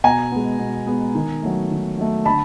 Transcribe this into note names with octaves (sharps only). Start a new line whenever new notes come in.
B2 G#5 A#5
G#3 B3
B2
G#3 B3
D#3
F#3 A3
D#3
F#3 A3
D3 A5 B5